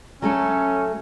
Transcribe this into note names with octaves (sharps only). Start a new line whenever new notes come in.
F#3 A3 C#4 A4